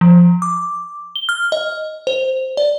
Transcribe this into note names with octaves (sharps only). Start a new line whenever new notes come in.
F3
D6
G7
F6
D#5
C5
D5